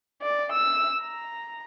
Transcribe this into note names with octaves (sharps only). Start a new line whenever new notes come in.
D5
E6
A#5